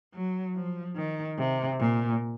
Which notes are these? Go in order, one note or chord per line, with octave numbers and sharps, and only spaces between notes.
F#3
F3
D#3
C3
A#2